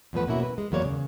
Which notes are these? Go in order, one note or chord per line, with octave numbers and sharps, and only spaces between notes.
E2 G2 F3 A3 B4 F#5
B2 A#3 C#4 E4 F#4
B4
G#3
E2 F#3 A#3 C#5 D5
C#3